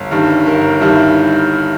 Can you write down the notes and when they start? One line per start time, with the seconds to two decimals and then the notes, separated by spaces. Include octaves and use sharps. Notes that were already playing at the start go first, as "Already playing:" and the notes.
Already playing: G1
0.11 G2 D#3 G3
0.46 G1 A#4
0.81 G2 D#3 G3 E4